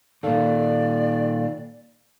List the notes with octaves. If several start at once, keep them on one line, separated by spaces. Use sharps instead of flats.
A#2 D#3 D#4 A4 D5 F5